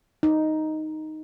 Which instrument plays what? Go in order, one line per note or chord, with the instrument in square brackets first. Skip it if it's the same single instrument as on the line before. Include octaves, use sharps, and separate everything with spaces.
[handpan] D#4